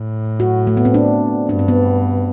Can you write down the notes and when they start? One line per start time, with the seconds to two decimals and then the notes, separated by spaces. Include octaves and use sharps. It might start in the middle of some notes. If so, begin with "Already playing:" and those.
Already playing: A2
0.40 F#4
0.67 A3
0.77 B3
0.85 C4
0.94 D4
1.48 G2 D4
1.59 C4
1.68 B3